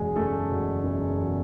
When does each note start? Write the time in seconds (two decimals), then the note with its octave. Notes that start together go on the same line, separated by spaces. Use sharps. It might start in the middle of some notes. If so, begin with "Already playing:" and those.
Already playing: F#1 E2 B2 G#3 G#4
0.16 F#1 A3 A4
0.50 E2 B2
0.83 F#1
1.17 E2 B2